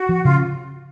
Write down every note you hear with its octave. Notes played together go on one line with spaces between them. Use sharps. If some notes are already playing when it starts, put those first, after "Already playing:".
Already playing: F#4
F3
C#3 F4